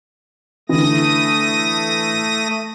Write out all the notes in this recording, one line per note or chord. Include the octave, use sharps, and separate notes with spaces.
D3 E3 A3 D#6 A#6